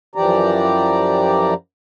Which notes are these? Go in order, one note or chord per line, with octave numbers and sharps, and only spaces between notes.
F#2 E3 F3 G4 D5 A#5